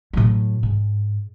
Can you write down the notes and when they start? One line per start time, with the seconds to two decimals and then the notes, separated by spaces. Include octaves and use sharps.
0.13 A2 F#3
0.63 G#2